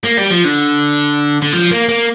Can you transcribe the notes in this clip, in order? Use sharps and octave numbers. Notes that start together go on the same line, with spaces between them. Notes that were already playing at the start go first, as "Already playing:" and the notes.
A#3
G3
F3
D3
D3
F3
A#3
A#3